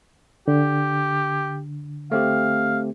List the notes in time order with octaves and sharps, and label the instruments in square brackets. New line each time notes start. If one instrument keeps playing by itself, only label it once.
[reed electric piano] D3 [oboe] G4
[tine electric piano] A3 C4 G4 [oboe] F5